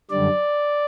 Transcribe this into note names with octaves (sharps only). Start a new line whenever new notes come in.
F#2 D3 G3 D5